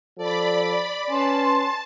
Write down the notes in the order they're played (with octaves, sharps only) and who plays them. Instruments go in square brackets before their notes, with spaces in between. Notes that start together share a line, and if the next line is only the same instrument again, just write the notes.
[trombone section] F3 A4 [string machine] D5 B5
[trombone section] C#4 [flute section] B4 G#5 C6 [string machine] A5